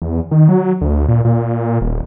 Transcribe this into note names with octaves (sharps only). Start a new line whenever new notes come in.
E2
D#3
F#3
D2
A#2
A#2
D#1